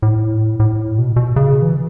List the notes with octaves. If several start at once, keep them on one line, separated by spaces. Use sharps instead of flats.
A2
A2
B2
B2
C#3
E3